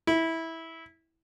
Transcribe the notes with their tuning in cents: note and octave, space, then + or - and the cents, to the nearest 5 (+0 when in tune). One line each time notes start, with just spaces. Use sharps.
E4 -15